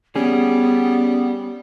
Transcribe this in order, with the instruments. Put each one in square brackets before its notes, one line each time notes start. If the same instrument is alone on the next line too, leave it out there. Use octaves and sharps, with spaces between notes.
[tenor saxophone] G3 [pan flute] B3 [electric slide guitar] C#4 G#4